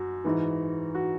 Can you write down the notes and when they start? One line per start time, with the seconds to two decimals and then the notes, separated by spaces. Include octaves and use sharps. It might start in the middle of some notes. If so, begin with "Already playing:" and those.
Already playing: F#2 F#4
0.24 G#2 E3
0.95 F#4